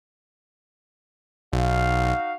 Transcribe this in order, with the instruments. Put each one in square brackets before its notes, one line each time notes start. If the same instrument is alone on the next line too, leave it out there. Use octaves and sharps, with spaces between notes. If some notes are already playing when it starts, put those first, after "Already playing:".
[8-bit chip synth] B1 [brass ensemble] D#4 F#4 F5